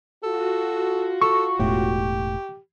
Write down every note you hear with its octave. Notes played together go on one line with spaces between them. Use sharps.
F4 F#4 A4
A4 C#6
E1 A2 G4